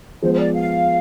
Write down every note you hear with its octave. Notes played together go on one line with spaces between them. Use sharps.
F3 G#3 B3 C5
C5
D5
F5